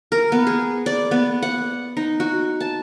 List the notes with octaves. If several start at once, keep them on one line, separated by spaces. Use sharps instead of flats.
A#4
B3
G#4
D5
B3
F#5
D#4
F#4
A5